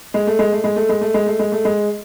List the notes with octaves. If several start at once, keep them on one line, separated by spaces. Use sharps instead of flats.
G#3
A3
G#3
A3
G#3
A3
G#3
A3
G#3
A3
G#3
A3
G#3